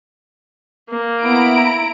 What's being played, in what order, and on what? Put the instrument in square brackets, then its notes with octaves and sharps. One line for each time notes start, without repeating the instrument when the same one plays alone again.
[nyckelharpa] A#3
[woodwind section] B3 [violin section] E4 A#5 D7